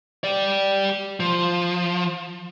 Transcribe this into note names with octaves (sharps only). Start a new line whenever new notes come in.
G4 D5
F3